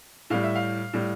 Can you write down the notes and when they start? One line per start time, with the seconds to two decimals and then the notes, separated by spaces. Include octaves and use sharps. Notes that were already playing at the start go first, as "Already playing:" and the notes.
0.30 A2 G3 F5
0.43 E5
0.55 F5
0.93 A2 G3